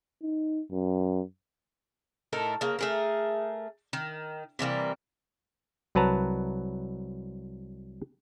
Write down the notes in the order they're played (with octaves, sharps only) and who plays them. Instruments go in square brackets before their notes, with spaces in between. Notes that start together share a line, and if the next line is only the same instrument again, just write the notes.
[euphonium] D#4
F#2
[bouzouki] A2 D#4 A4 A#4
C#3 A#3
A3 G#4 A#4
D#3
C3 E3 G3 A#3
[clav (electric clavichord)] C2 F#3 B4 A5 A#5